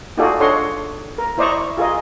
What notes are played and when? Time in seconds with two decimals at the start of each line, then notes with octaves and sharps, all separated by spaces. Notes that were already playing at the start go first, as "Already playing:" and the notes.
0.17 D#4 F4 F#4 G#4 A4 D5
0.40 D4 A4 C#5 D#5 F#5 C6
1.18 A#4
1.38 E4 C5 D5 D#5 A#5 C#6
1.77 F4 G#4 A#4 D#5